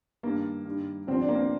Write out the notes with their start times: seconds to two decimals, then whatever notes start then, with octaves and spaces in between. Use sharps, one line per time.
0.23 G2 D#3 A#3
0.66 G2 D#3
1.07 D2 C3 F3 C4
1.21 D4
1.29 A#3
1.35 C4